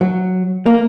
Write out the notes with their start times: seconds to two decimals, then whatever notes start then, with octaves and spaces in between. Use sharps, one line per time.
0.01 F#3
0.66 A#3